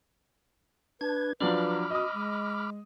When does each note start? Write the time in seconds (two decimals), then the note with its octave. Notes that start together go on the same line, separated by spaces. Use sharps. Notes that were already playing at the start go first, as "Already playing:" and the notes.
1.01 D4 B4 G#6
1.40 F3 F#3 D4 B4 B5 D6 F6
1.90 F#4 D#5 D#6
2.13 G#3